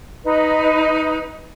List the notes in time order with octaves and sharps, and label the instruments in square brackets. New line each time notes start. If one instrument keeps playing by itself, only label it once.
[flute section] D#4 B4